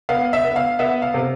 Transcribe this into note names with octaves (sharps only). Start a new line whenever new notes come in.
B3 F5
E5
B3
F5
B3 E5
F5
C3